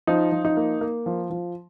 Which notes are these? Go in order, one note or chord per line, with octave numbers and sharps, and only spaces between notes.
F3 D#4
F3
D#4
A#3
A#3
F3
F3